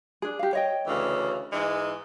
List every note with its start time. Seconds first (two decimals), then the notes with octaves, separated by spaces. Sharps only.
0.22 D4 G#4
0.39 G4 F5
0.53 C#5 D#5 G5
0.87 D2 C#3 E3
1.52 G#2 E3 G#3